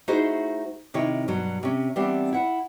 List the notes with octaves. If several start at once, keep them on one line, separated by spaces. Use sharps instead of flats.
A3 D#4 E4 F#4 G#4 C5
C3 D#3 E4 C#5
G2 B2 F#3
C3 C#4
E3 G3 B3 C4 D4
E4 F#5